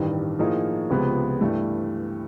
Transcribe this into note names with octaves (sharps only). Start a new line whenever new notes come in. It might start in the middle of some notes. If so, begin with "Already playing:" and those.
Already playing: A1 G2 D#3
A2 F3 A#3 D#4 G#4
C#2 C3 F3 G#3 B3
G2 E3 A3